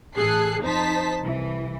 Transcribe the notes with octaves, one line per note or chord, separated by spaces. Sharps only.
A1 G#4 A4 F#6 C7
F2 D#4 C5 A5 B6
C2 E3